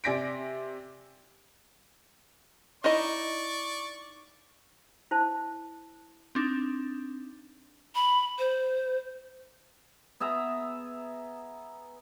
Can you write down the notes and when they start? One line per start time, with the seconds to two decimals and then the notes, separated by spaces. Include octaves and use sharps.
0.04 C3 D5 G#5 A#6 B6 D7
2.84 D#4 E4 D5 D#5 C#6
5.11 E4 C5 A5
6.35 C4 D4 D#4
7.95 B5
8.39 C5
10.20 B3 G#4 E5 A#5